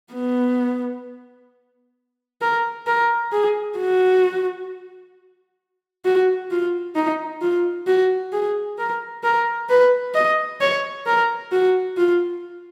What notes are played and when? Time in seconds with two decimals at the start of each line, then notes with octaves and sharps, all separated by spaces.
0.13 B3
2.41 A#4
2.87 A#4
3.32 G#4
3.77 F#4
6.05 F#4
6.51 F4
6.95 D#4
7.41 F4
7.87 F#4
8.32 G#4
8.78 A#4
9.24 A#4
9.69 B4
10.14 D#5
10.60 C#5
11.06 A#4
11.52 F#4
11.97 F4